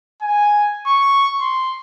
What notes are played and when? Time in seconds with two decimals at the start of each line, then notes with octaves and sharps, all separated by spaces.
0.22 G#5
0.86 C#6
1.40 C6